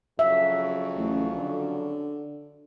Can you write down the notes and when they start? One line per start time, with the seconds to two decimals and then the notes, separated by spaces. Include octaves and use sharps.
0.19 F2 C#3 F#3 E5
0.97 A1
1.37 D3